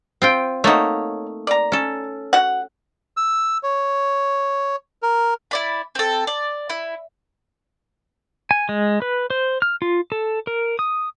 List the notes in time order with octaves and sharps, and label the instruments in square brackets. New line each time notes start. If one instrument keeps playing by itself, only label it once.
[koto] C4 F4 G5
[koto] A3 A#3 D#4 [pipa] F#4 C#5
[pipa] D5 A#5
[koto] C#4 A4
[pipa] F#4 F#5
[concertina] E6
C#5
A#4
[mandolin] E4 D5 B5
C4 A4
D5
E4
[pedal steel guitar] G#5
G#3
B4
C5
F6
F4
A4
A#4
D#6